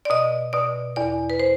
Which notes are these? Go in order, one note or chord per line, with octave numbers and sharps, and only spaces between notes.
D5
B2 D#5
B2 D5
E2 D5
B4
C5